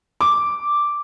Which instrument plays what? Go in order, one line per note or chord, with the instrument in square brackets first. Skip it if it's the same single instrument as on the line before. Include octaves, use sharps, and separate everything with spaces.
[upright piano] D6